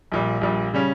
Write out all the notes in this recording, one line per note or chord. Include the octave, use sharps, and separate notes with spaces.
A#1 A#2 G3
A#1 A#2 G3
C#3 G3 C#4